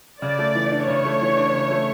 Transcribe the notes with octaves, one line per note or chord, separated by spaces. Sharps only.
C#3 D5
A3
E3
D4
C#3 C#5
A3
E3
D4
C#3
A3